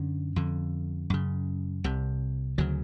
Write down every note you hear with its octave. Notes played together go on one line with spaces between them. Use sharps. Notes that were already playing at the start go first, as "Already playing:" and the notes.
Already playing: F#2 D3 C#4
F2 D3
F#2 C#3
C2 C3
D2 C#3 F#3